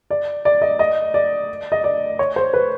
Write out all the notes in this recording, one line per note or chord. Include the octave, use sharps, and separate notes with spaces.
D5
D5
D#5
D#5
D5
D#5
D5
C#5
C5
B4